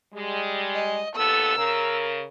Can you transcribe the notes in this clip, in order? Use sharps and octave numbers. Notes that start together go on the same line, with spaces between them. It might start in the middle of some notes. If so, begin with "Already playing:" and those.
G3 G#3
D#5
D#2 B3 A4 E6
C#3 A#4